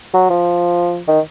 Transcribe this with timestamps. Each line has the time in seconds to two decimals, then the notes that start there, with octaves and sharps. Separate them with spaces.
0.14 F#3
0.30 F3
1.08 D#3